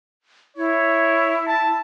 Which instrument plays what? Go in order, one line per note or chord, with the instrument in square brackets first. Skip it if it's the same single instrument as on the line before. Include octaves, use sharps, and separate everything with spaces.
[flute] E4 [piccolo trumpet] C#5
[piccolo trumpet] A5